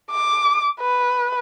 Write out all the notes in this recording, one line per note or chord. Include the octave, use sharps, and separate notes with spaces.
D6
B4